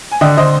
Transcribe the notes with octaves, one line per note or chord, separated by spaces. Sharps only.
G#5
D3 D#5 G5
D3 C5 D#5